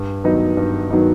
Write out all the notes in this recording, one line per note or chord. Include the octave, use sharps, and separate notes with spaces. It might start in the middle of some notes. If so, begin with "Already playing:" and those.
Already playing: G2
D#3 F#3 B3 D#4
G2
D#3 F#3 B3 D#4